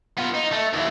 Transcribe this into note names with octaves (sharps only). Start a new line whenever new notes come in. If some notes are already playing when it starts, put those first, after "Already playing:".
B3 F4
D#4
A3
D#2 E4